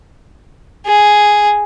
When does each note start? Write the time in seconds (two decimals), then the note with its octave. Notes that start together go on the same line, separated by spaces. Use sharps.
0.86 G#4